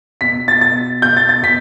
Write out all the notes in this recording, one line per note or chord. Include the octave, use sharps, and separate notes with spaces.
B2 B6
A6
B2 A6
B2 G6
A6
A6
B2 B6